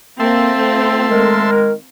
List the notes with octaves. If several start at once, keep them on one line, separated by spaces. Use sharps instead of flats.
A#3 C4 F4 A4 E5 A5 C6
A3
D#3 G#3 A#4